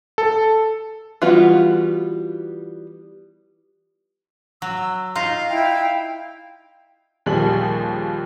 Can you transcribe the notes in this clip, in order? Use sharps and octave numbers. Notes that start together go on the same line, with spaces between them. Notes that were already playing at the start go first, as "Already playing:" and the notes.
A4
E3 G3 B3 F4 F#4
F#3 E6
D#4 F4 F5
E4 G5
D#2 A#2 F3 G3 G#4 F#7